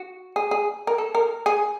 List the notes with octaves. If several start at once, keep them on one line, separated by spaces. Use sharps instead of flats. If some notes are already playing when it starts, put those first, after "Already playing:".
Already playing: F#4
G#4
G#4
A#4
A4
A#4
G#4